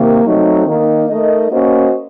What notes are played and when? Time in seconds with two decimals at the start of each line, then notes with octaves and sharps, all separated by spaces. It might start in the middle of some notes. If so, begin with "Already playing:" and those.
Already playing: C3 D#3 A#3
0.25 F#3 A3 C4 D#4
0.67 D#3 A#3 D#4
1.09 A3 D#4 A#4 D#5
1.51 A#3 C#4 F#4 C5 D#5